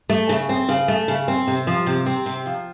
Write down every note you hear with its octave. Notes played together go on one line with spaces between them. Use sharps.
A3
C#3
C4
C#3
A3
C#3
C4
C3
F3
C3
C4
C3
F3